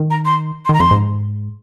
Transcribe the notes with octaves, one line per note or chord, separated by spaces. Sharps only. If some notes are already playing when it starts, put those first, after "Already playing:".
Already playing: D#3
A#5
C6
C6
D#3 A#5
F2 C6
G#2